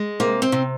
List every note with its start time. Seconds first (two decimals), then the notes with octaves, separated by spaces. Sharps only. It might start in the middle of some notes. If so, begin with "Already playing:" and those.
Already playing: G#3
0.20 C3 A#3
0.42 C4
0.52 C3